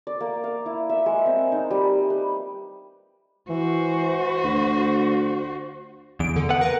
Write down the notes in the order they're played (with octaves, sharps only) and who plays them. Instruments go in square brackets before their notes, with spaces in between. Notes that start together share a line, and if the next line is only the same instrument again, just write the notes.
[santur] D5
A#3
F5
E4
E5
G#3
C4
D#4
G3
B4
[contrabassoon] E3 [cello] F#4 C5
[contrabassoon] D2
[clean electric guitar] E2 [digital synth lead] D7
[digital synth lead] D3
[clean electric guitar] B3 F#5
[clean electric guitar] A#4 [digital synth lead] B4